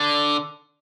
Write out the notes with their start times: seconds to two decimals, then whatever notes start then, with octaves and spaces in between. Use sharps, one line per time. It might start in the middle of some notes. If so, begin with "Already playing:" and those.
Already playing: D3